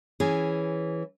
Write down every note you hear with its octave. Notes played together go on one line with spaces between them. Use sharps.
E3 C#4 G#4